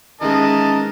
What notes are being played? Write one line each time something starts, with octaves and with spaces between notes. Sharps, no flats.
D#3 E3 G#3 C#4 A#4 D#5 A5